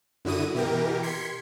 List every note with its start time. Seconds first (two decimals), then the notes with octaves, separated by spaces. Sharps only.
0.25 F#2 D3 E4 F#4 D#6 D#7
0.54 B2 E3 G4 A#4
1.03 C6 G#6 B6 C#7